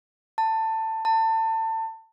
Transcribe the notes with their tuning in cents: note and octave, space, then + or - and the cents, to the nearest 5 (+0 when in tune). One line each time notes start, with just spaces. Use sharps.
A5 +15
A5 +25